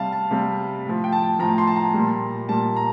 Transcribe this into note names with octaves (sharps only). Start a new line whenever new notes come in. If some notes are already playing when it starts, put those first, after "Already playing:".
Already playing: C3 G3 F5 A5
A5
C3 G3
A2 F3
G5
A5
A2 F3 A#5
C6
A5
A#5
A#2 G3
A#2 G3 A5
A#5